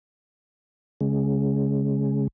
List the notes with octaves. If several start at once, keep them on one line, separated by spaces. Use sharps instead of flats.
C#3 G#3